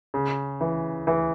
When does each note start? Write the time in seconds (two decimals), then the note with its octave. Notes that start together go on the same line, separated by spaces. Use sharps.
0.14 C#3
0.61 E3
1.07 E3